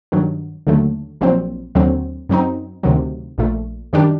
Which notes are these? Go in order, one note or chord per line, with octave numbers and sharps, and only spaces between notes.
G2 D#3 F#3
D#2 D3 F#3 A3
A#1 A#2 F#3 C4
D#2 D3 F#3 C4
F#2 F#3 C4 D#4
D2 C3 D#3 F#3
A#1 A#2 A3
F#2 D#3 G3 D4 G4